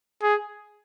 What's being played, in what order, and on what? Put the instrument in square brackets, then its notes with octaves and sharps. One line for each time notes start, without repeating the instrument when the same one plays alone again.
[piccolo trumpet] G#4